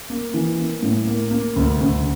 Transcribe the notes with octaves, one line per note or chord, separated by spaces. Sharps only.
A#3
E3
A#3
A2
A#3
A#3
D2
D2